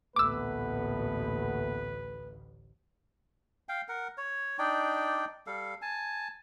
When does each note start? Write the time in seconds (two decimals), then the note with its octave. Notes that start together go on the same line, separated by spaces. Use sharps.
0.16 A1 D2 A#2 A3 B3 B4 D6 E6
3.69 F5 G5
3.88 A#4 F#5
4.17 C#5
4.59 D4 D#4 D5 G5
5.47 G3 A4 F5
5.82 G#5 A5